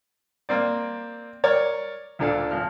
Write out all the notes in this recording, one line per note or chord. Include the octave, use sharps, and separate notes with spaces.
A#3 C4 D5
A#4 C#5 D5
D2 A#2 D4 A4 F5
G#1 F3 F6